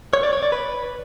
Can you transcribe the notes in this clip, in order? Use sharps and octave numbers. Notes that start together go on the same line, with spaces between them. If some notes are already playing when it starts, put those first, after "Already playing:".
C#5
D5
C#5
D5
B4